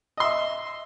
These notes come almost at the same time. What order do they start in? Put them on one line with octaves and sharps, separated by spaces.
D#5 C6 E5